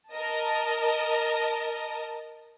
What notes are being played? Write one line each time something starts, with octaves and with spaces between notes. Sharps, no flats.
A#4 D#5 A5